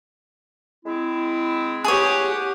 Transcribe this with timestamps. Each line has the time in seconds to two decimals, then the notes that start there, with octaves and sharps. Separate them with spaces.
0.85 G#3 C4 E4
1.84 G4 G#4 C#5 F#5